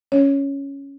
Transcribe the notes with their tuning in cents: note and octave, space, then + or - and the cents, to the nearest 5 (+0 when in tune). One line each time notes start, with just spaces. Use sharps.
C#4 +0 C#5 +0